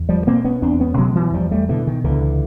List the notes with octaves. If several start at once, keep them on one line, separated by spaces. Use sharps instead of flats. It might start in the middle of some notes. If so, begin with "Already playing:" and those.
Already playing: E2
F3 G3
B2 A#3 C4
B3 C#4
E2 C4 D4
B3 C#4
B2 F#3 G#3
E3 F#3
E2 F3 G3
G3 A3
B2 D3 E3
D#3
C#2 D3 E3